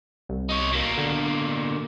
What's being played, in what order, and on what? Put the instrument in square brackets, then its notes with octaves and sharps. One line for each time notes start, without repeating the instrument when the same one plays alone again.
[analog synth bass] C2
[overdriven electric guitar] D#4 C#5
B2 A#3
[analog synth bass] D3